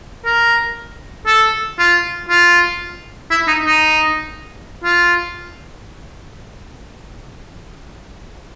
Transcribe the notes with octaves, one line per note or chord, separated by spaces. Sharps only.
A#4
A4
F4
F4
E4
D#4
D#4
F4